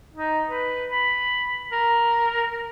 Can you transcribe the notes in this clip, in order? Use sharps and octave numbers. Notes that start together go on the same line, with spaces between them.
D#4
B4
B5
A#4